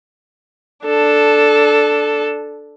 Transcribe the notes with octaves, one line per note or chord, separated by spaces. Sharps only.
D4 A4